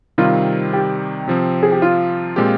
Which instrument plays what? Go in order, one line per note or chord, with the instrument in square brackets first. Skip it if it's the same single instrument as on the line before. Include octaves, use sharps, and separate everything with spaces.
[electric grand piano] C3 D#3 G3 C4 [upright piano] F4
[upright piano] G4
[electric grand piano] C3 F3 C4
[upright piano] G#4
G4
F4
[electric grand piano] A#2 G#3 C4 G4